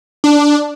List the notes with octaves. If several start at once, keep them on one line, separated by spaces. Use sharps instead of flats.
D4